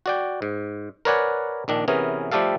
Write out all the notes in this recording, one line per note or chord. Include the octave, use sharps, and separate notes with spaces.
F#4 D5 G5
G#2
A#4 B4 C#5 D5 F#5 G#5
A#1 D#3 D4
C3 E3 B3 C#4 G#4 A#4
F3 G3 A3 G4 A4 F5